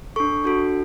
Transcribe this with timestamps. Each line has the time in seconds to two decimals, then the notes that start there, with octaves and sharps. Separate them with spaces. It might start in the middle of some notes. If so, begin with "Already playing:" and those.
0.16 D4 A4 C#6
0.44 D4 F#4 A4